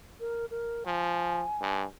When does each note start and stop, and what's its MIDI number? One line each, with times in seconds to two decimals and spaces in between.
0.20 0.46 70
0.51 0.84 70
0.86 1.44 53
0.86 1.85 80
1.62 1.84 43